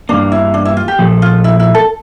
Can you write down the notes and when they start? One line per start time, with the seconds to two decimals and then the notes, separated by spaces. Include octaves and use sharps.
0.09 G2 E3 A#3 D4
0.32 E4
0.54 D4
0.65 E4
0.77 F4
0.88 G4
0.99 A#2 F3 A3
1.22 F4
1.44 E4
1.60 E4
1.75 A4